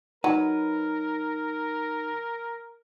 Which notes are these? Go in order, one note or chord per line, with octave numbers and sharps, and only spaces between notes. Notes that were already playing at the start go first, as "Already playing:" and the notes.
F#3 D#4 A#4 B4